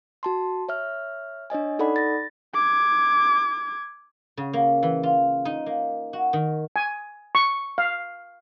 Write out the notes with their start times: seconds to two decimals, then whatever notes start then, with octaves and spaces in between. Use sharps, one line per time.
0.23 F#4 A5 C6
0.69 C#5 E5 F6
1.50 D4 C#5 D#5 G#5
1.79 D#4 A4 D5 F#5 B5
1.96 A6 A#6
2.54 D6 G#6
4.37 C#3
4.53 A#3
4.83 E3
5.03 F4
5.45 D#4
5.66 A#3
6.13 F#4
6.33 D#3
6.76 G#5
7.35 C#6
7.78 F5